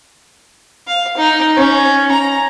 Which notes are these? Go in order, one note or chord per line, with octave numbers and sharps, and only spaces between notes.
F5
D#4
C#4
A#5